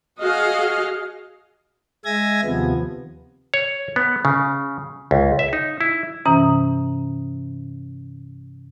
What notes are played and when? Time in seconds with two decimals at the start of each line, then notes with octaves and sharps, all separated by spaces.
0.21 F#4 G#4 D#5 F5
2.05 G#3 E5 G#5 G#6 A#6
2.44 D#2 C3 F3 B3
3.54 C#5
3.96 B3
4.25 C#3
5.11 C#2
5.39 E5
5.53 D#4
5.81 E4
6.25 G2 C3 E3 C#4 A#5 D#6